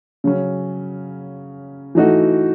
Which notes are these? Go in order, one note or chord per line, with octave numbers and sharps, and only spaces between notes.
C#3 F#3 C#4
E3 A3 D#4 F#4